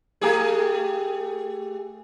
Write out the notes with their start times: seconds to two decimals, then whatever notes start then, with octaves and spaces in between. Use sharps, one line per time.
0.21 A3 G4 G#4